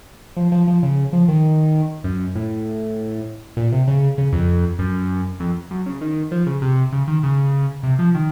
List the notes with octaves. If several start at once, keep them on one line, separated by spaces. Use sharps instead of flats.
F3
F3
F3
C#3
F3
D#3
F#2
A2
A#2
C3
C#3
C#3
F2
F#2
F2
F#2
C#3
D#3
F3
C#3
C3
C#3
D#3
C#3
C3
F3
D#3